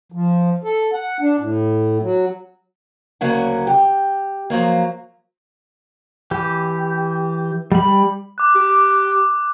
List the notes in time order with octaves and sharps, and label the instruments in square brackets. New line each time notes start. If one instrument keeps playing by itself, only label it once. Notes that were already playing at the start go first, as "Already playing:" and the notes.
[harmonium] F3
A4
F#5
D4
A2
F#3
[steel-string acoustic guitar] D2 C#3 F#3 A#3 F#5
G4
F3 F#3 A#3
[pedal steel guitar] E3 G4
G3 B5
[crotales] D6 F#6
[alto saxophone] G4